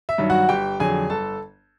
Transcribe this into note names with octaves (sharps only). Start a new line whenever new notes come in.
E5
G2 D#3 F#3
F#4 F#5
G1 G4 G5
F2 D3 F#3 G#4 G#5
G1 A4 A5